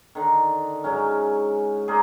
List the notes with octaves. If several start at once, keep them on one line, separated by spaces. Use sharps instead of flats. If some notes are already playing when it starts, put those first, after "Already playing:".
D3 D#3
G#2 F#3 C#4
G#4 A#4 C5 D5